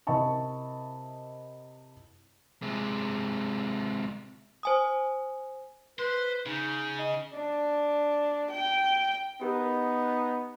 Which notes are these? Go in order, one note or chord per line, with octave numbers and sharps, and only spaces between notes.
C3 E4 A#4 D#5 A5 C#6
C3 G#3
C5 G#5 D#6
B4 C5
C#3 D#4
D#5
D4
G5
B3 D#4 G4 A#4